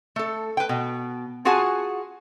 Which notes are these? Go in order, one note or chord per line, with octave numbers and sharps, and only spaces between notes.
A3 A4
B4 G5
B2
F4 F#4 G#4 F#5 G#5 A5